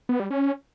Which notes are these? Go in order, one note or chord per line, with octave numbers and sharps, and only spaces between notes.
B3
G3
C#4